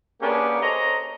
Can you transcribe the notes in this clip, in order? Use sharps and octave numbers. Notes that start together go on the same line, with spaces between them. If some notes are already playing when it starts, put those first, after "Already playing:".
A#3 B3 C#4 D4 G4 G#4
A4 C5 C#5 D#5 A#5